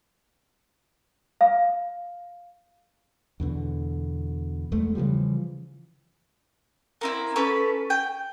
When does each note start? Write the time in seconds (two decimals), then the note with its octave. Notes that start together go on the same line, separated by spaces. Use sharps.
1.41 F5
3.40 E2 B2 D3
4.72 E2 G#3 A3 B3
4.95 C#3 E3 F3 G3
7.01 A#3 C4 E4
7.36 C#4 A4 B4
7.90 G5